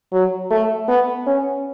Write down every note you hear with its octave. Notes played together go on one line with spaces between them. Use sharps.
F#3
A3
B3
C#4